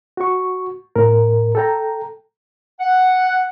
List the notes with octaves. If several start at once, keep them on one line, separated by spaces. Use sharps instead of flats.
F#4 C#6
A2 A#4
A4 G5 A#5
F#5